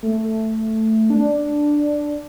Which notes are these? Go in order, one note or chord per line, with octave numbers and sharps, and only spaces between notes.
A3
D4